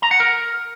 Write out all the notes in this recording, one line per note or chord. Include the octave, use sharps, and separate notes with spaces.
A#5
F#5
A#4